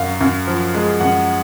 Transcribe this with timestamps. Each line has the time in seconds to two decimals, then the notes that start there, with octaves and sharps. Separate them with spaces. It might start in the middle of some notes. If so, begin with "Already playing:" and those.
Already playing: F#2 F5
0.21 F#2
0.47 F3
0.74 G#3
1.00 F#2 F#5